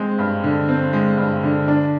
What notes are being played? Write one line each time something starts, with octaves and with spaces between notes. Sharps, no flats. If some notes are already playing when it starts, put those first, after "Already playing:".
Already playing: G#3 C4
G2
D3
C4
G#3
G2
D3
D4